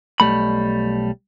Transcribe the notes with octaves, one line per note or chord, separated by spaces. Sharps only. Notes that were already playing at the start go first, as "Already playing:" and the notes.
B1 G3 A3 B5